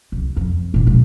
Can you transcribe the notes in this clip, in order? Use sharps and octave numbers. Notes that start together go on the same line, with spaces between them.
C2
F2
A2 D#3
B2 G#3